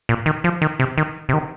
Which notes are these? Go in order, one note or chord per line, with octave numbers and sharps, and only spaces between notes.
A#2
D#3
F3
D#3
C3
D#3
C3
D#3